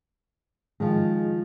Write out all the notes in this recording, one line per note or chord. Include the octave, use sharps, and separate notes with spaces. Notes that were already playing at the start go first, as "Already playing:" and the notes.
D#3 F3 G#3